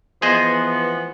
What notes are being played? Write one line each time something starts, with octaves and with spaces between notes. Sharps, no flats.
E3 F3 B3 G#4 C5 D#5